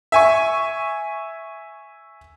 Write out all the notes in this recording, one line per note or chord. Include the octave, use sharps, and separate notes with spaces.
E5 G#5 C#6